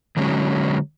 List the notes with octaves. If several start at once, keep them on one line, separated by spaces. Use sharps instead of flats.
D3 F#3 G#3 C#4